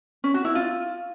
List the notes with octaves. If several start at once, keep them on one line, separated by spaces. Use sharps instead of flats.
C#4
F#4
E4
F4